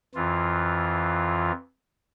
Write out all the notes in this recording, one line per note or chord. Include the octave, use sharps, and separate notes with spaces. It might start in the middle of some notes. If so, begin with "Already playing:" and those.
F2 E3 F4